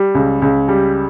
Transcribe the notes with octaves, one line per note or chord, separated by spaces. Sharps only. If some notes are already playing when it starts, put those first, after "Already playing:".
Already playing: G3
C#2
C#2
G3